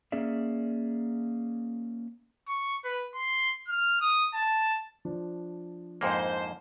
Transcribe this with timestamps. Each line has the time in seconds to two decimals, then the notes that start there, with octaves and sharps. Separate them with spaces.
0.12 A#3 C#4 G#4 D5 E5
2.48 C#6
2.84 B4
3.15 C6
3.68 F6
4.01 D#6
4.34 A5
5.05 F3 D4
6.01 F2 G#2 A#3 C5